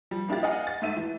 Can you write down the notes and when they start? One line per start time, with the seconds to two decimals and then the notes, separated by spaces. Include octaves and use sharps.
0.11 F3 G3
0.29 A#3 D4 E4 G4 A6
0.43 D#5 F5 F#5 G#5
0.67 A6
0.82 G#2 A3 E5 D#7
0.97 E3